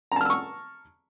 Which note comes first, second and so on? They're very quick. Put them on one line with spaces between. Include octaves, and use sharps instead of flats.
A#5 A5 F6 E6 C#6